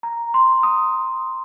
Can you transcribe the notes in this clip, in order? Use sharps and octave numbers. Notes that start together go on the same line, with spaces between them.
A#5
C6
D#6